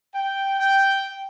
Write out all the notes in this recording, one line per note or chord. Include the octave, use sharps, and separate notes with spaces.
G5
G5